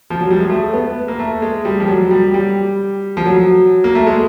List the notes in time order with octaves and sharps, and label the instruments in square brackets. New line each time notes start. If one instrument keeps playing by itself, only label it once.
[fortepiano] F3
F#3
G3
G#3
A3
B3
A#3
A3
G#3
G3
F3
F#3
G3
G3
F3
F#3
A#3
A3
G#3